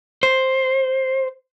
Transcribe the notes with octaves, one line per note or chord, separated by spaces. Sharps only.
C5